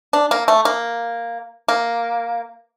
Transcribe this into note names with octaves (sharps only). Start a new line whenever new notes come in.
D4
A#3
A3
A#3
A#3